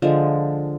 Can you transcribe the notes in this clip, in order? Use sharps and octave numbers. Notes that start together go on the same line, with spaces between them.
D3 F3 G#3